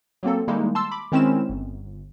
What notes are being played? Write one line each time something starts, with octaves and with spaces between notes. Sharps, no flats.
F#3 A#3 C4 A4
D#3 G3 G#3 A#3 D#4 E4
A5 C6 E6
B5 D6
D#3 G#3 C4 C#4 E4 E7
G1